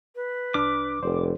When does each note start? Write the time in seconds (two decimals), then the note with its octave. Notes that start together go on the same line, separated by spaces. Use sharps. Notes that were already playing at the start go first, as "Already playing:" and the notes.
0.15 B4
0.54 C2 D4 D6 F6
1.03 F1 C5 D5